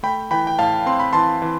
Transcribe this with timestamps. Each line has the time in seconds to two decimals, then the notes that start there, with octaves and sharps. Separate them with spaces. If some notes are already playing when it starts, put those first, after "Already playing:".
0.03 A3 G5 B5
0.31 E3 G5 B5
0.47 G5
0.59 A2 F5 A5
0.86 C4 C6
1.00 B5
1.13 E3 A5 C6
1.42 E3